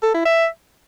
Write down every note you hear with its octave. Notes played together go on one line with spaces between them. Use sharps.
A4
E4
E5